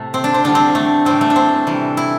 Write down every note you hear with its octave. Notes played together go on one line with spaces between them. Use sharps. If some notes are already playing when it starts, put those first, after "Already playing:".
Already playing: A2 C3 A3
C4
D4
C4
E2 D3 G3 D4
C4
A3
A2 E3 G3 C4
A3
D4
C4
C3 E3 G3
E4